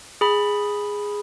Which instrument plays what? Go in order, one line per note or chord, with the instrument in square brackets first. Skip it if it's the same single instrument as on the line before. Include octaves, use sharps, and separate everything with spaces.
[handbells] G#4 B5